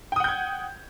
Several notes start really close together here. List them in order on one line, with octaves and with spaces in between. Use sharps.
G5 D#6 F#5 G6 G#6